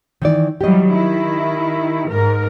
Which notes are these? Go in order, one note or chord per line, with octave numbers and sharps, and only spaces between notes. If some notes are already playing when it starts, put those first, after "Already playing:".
D#3 E3 D5
E3 F#3 G3 G4 D#5
D#3 E4
G#2 A#4